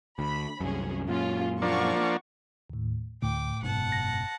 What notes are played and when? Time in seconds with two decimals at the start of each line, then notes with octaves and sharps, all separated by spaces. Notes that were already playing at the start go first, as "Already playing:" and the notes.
0.19 D2 B5
0.60 C2 F#2 C#4 G#4
1.08 F#2 A#2 C#4 F4
1.62 F3 A#3 D4 F#5 C#6
2.70 D#2 A2
3.22 D2 A2 G5 D6
3.62 F#1 G#2 B2 F#5 A5
3.92 A#6